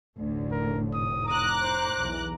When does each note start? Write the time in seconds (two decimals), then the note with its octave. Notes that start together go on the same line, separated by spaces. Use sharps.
0.18 F1 D2 A2 D3
0.51 A#4
0.93 D#6
1.28 A#5 D6 D#6 F#6
1.60 C5
1.98 B1 E2 E3